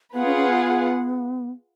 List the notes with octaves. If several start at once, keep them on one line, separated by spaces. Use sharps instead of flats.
B3 F4 G#4 B4 F#5
C#4
C#4
B3